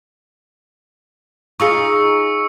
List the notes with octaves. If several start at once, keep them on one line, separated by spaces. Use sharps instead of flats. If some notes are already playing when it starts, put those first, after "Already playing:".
D#4 F4 G#4 C#6 E6 C#7